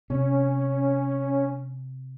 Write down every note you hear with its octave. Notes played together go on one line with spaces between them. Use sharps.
C3 C#4